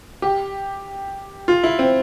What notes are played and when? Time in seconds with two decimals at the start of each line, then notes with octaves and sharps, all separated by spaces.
0.22 G4
1.48 F4
1.64 E4
1.79 C4